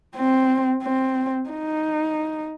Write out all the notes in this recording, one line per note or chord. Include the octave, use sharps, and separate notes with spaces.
C4
C4
D#4